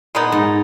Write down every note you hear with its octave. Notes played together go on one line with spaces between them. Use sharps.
A#2 G#3 B3 D#4
G#2